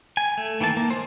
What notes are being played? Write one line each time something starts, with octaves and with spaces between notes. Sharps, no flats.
G#5
A3
D#3 E3 A#3 A5
A#3
G#3 C5